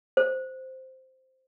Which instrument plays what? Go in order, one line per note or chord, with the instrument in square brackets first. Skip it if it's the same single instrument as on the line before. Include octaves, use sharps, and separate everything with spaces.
[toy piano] C5